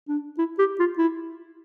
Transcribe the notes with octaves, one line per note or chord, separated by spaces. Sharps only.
D4
E4
G4
F4
E4